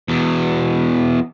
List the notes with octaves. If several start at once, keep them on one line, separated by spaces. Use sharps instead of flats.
E2 B2